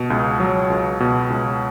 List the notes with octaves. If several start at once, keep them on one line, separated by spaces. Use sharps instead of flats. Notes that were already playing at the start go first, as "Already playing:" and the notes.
Already playing: B2
C#2
F#3
C#2
B2
C#2